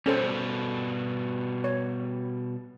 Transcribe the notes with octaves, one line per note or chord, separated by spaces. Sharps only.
B2 G3 C#4 A4 C5
C#5